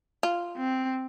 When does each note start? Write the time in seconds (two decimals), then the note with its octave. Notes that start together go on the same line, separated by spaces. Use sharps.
0.23 F4
0.57 C4